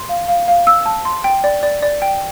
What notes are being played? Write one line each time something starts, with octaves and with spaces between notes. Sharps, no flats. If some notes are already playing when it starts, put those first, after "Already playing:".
Already playing: C6
F5
F5
F5
E6
A5
C6
G5
D5
D5
D5
G5